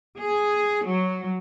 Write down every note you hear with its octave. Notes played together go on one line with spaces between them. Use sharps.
G#4
F#3